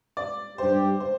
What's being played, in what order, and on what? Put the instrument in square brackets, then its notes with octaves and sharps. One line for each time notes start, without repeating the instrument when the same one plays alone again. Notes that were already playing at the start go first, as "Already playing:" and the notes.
[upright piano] D5
[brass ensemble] G2 G3 D4 G4 [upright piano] C5
[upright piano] C5